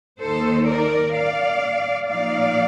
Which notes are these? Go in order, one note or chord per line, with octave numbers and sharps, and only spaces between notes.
D#2 D#3 A#3 D#4 A4 C5
A#4 D5
D5 F5
A#2 F3 A3 D#4 D5 F5